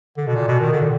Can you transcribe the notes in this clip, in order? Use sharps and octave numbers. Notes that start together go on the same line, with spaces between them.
D3
B2
A#2
B2
D#3
D3
A#2